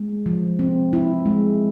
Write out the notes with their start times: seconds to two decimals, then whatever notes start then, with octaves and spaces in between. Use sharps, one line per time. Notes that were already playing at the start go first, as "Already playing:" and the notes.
Already playing: G#3
0.26 F3
0.59 C4
0.93 E4
1.26 G#3